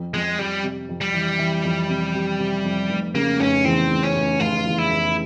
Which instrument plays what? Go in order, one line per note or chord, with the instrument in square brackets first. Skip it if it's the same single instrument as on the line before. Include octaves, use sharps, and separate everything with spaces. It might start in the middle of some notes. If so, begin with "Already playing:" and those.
Already playing: [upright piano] F2
[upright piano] F2 [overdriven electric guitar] G#3
[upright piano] F2 [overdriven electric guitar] G3
[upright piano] C3
F2
[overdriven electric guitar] G3
[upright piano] E3
E3
F2
C3
C3
C3
F2
F1
[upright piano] C#3 [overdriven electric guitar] A#3
[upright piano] F1 [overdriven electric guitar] C#4
[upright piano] E2 [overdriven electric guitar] C4
[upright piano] F1
[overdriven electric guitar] C#4
[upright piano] F1
[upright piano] F1 [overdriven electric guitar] F4
[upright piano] E2
[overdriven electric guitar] E4
[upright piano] F1